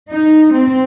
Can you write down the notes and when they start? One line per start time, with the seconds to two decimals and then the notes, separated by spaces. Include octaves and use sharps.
0.11 D#4
0.54 C4